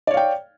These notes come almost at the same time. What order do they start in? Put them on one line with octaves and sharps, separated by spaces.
D5 C#5 F5 G5